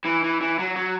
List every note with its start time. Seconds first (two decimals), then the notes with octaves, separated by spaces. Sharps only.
0.05 E3
0.23 E3
0.41 E3
0.59 F#3
0.76 F#3